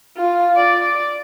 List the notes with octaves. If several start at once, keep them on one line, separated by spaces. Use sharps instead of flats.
F4
D5